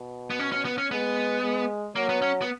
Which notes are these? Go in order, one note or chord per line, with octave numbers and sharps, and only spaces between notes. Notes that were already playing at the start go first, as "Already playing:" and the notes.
Already playing: B2
B3
C#4
C#4
B3
C#4
G#3 B3
G#3
F#3 A#3
B3
C#4
B3